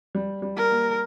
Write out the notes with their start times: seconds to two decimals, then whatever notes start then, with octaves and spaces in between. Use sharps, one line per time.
0.15 G3
0.42 G3
0.57 A#4
0.70 A#3